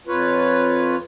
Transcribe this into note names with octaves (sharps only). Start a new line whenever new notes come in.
F2 F4 B4 C#5